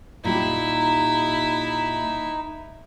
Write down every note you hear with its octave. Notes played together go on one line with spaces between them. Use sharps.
A#2 G3 D#4 E4 G4 E5